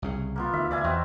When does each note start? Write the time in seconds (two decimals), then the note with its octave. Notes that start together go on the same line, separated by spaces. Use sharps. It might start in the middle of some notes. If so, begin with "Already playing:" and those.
0.02 C2 C#3
0.36 A#3 B3 F4
0.53 D2 D#3 E5 F5
0.71 D2 D5 E5 G#5
0.84 E2 C4 F#4 D#5